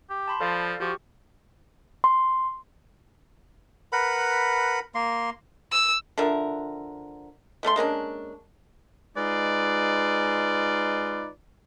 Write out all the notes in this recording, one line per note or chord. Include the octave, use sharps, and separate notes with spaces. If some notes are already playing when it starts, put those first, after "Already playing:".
G4
A5 B5 C6
F3 A4 D5 F5
F3 F#4 G4 C#6
C6
A#4 B4 F#5 B5
A#3 C6
E6
D3 F3 A#4 E5
B2 A3 C#4 C6
G#3 A#3 C#4 D4
G#3 D#4 F4 B4 D5